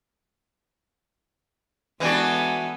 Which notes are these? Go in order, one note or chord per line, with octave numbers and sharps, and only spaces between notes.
E3 G#3 B3 D4 F#4 A4 G#5 A5